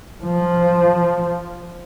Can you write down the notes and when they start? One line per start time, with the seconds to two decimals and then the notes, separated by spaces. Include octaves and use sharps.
0.24 F3